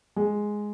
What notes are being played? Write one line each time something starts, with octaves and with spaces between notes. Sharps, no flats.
G#3